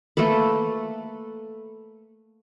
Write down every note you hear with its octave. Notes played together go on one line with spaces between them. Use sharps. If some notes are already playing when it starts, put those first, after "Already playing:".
A3 A#3 A4 B4